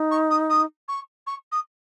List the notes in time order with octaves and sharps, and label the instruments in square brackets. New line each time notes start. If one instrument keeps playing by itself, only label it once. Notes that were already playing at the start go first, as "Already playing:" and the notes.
Already playing: [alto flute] D#4
[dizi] C#6
D#6
D#6
C#6
C#6
D#6